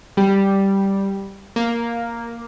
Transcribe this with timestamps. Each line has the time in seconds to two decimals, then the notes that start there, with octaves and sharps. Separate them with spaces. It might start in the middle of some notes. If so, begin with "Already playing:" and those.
0.17 G3
1.56 A#3